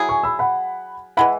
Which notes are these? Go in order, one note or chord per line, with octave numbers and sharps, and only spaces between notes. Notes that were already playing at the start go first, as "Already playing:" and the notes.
Already playing: F#3 E4 G#4
G#5 C#6
B5 E6
F#5 B5
E3 G#3 E4 F#5 B5